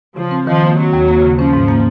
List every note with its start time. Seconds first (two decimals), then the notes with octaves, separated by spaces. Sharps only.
0.16 C#3 F3
0.31 C4
0.47 D#3 F3
0.62 A#3
0.77 F#3 C4
0.93 D#2
1.08 A#3
1.22 C#3
1.38 F3 C#4
1.53 G#2
1.68 A#3